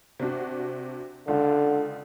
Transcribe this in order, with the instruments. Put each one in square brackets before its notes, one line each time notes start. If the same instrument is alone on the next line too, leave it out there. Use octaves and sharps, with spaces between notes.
[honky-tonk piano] C3 D4 F#4
[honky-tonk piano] C#2 F4 [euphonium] D3